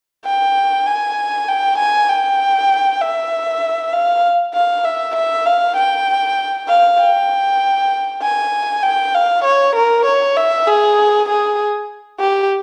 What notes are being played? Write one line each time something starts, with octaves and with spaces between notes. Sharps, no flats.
G5
G#5
G5
G#5
G5
E5
F5
F5
E5
E5
F5
G5
F5
G5
G#5
G5
F5
C#5
A#4
C#5
E5
G#4
G#4
G4